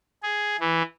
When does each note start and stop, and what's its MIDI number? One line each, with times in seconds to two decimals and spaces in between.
0.23 0.56 68
0.60 0.83 52